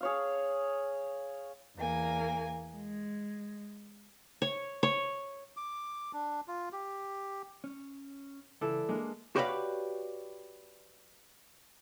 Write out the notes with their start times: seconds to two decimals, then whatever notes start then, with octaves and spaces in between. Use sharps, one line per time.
0.01 G#4 C#5 F5
1.77 E2 A#3 G#5
2.75 G#3
4.42 C#5
4.83 C#5
5.57 D6
6.13 D4
6.48 F4
6.72 G4
7.64 C#4
8.61 C#2 E3 A4 D5
8.89 G#3 A#3 D4
9.36 F#4 G4 B4 C#5 D5 F5